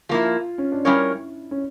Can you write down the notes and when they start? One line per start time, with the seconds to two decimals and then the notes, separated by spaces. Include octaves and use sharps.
0.09 F3 A#3 E4 F4
0.58 C#4
0.72 D4
0.85 G3 C#4 E4 F4 A#4 C#5
1.51 C#4